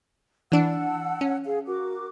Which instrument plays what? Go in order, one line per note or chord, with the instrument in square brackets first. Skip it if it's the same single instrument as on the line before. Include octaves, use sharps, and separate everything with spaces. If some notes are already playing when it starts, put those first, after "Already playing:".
[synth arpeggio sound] E3 D4 [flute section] F#5 A5 E6
[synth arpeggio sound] C#4
[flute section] G#4 F5
F#4 A#4 D6